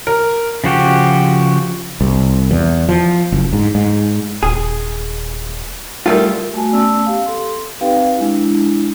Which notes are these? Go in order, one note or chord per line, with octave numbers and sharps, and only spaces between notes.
A#4
C#3 F3 F#4 G4
C2
E2
F3
F#1
G#2
G#2
D#1 G#4
G3 A3 D#4 F4 A#4
A3 F#4 G#5 A5
A3 B3 C#4 D5 A5 E6
C#4 G4 F5
A4 C6
C4 D#4 G4 B4 F5 G5
G#3 D4 E4